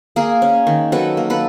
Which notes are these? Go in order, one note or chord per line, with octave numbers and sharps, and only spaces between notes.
A#3 G#4 A#4
C#4
D#3
F#3 A4 B4
A#3
A4 B4